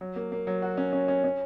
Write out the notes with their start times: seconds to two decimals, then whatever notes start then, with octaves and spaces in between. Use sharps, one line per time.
0.01 F#3
0.16 A#3
0.32 A#3
0.47 F#3
0.62 F#4
0.77 C#4
0.93 C#4
1.08 C#4
1.24 C#4